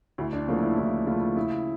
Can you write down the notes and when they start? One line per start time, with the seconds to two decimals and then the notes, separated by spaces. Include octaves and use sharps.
0.18 D2 E4
0.33 D4
0.48 C#3 F3 A3 A#3
0.62 E4
0.77 D2 E4
1.06 C#3 F3 A3 F4
1.36 C#3 E4